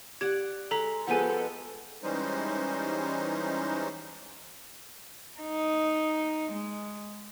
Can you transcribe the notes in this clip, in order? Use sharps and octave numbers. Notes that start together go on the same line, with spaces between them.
G4 D5 F#5 G#6
G#3 A4 A#5 B6
F3 G#3 B3 G4 A4 F#5 G#5
E3 G3 G#3 C#4 D#4 C5
D#4
G#3